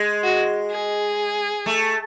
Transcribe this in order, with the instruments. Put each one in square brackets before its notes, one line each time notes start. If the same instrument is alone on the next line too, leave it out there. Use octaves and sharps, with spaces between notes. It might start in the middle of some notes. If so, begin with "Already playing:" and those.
Already playing: [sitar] G#3
[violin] F#4
G#4
[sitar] A3